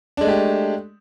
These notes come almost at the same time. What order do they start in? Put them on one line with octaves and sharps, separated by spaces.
D4 G#3 A3 G4